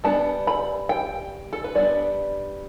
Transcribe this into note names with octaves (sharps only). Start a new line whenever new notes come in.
G3 B3 D4 A5
B5
G5
A4
B4
G3 B3 D4 D5